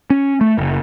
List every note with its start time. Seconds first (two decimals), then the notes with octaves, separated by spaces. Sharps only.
0.10 C#4
0.41 A3
0.58 F#1